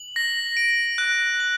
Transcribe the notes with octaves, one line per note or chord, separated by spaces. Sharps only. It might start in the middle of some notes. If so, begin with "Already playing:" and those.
Already playing: F#7
A#6
D7
F#6
F#7